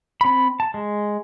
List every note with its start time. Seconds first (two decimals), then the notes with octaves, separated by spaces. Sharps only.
0.21 C4 B5
0.60 A5
0.74 G#3